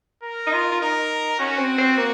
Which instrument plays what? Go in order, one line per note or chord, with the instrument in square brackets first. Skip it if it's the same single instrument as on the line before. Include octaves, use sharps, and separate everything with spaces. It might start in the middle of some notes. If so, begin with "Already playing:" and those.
[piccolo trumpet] A#4
[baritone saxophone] D#4
F4
F4
[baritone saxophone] D#4 [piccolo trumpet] A#4
[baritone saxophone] C#4 [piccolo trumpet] F#4
[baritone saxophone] C4
C4
A#3